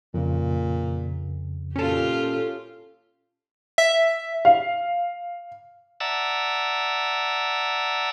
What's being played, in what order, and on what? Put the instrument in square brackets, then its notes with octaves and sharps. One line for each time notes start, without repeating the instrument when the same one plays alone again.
[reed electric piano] F2 C#3 [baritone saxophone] A#2
[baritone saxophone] A#2 [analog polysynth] C#4 A4 [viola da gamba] F4 G4
[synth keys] E5
[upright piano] F5
[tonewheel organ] D5 E5 F#5 A5 A#5 E6